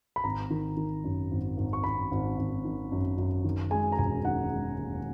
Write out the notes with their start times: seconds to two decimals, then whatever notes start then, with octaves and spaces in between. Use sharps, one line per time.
0.16 B5
0.24 G#1 A#5
0.50 D#3
0.77 D#3
1.04 F#2
1.31 G#1
1.57 G#1
1.73 C#6
1.84 G#1 B5
2.11 G#1
2.38 G#1
2.65 D#3
2.92 F#2
3.18 F#2
3.44 D#3
3.71 G#3 G#5
3.92 A#5
3.98 E1 G#5
4.25 D#3 F#5
4.52 G#3
4.79 D#2